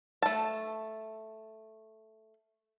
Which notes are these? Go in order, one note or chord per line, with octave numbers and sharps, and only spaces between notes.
A3 A5